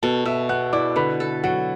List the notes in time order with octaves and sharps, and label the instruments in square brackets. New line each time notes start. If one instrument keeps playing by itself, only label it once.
[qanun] B2 [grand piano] A4 A5
[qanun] B2 [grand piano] E5 E6
[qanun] B3 [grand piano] F#5 F#6
[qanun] E4 [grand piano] D5 D6
[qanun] D3 [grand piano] B4 B5
[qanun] A4
[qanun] F#3 [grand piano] F#4 F#5